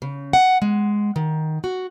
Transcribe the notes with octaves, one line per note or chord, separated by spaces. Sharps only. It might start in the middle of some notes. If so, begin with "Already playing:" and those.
C#3
F#5
G#3
D#3
F#4